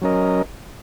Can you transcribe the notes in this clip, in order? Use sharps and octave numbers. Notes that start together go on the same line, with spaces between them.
F#3 C#4 A#4 D#5